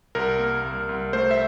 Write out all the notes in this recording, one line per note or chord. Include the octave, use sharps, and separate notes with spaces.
C2 A#4
A#3
C2
C2
A3 C5
E5